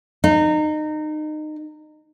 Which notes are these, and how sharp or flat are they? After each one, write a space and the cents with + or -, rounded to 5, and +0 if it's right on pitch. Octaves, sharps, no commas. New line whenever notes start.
D#4 -25